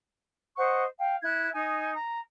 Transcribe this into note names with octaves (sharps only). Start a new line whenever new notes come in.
C5 D#5 F#5 C#6
F5 G5
E4 F#6 G#6
D#4 D#5 G#5
A#5